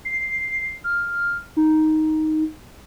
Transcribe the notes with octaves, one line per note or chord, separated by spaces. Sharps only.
C7
F6
D#4